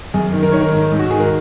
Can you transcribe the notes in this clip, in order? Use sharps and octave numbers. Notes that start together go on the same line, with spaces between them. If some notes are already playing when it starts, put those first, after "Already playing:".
F#2 G#4
D#3
A#4
D#3 C#5
A#4
G#2
G#2
F#4
D#3 G#4
A#4